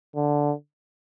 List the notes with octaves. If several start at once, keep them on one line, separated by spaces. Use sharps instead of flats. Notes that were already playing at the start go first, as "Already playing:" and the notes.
D3